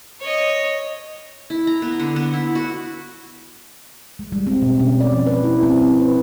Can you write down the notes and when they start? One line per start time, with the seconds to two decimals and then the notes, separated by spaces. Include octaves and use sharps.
0.20 C#5 D#5
1.50 E4
1.67 A#5
1.82 B3
2.00 D3
2.16 B3
2.33 E4
2.55 F#4
4.19 G#3
4.32 G3
4.47 C4
4.62 B2
4.80 C#4
5.00 D5
5.13 F3
5.27 B4
5.44 E4
5.63 C4
5.82 C4
6.00 B4